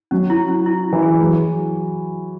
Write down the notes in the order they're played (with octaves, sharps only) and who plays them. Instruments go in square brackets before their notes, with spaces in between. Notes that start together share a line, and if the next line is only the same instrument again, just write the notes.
[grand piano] F#3 [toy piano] C#4
[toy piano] E4
C#4
E4
E4
[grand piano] E3
[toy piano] G#4
[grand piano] F#3 [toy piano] G#4